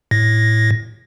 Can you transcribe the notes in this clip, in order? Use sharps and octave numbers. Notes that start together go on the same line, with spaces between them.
A2 A#6